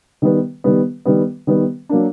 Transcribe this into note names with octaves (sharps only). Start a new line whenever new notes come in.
D#3 G3 B3
D#3 G3 B3
D#3 G3 B3
D#3 G3 B3
F#3 A#3 D4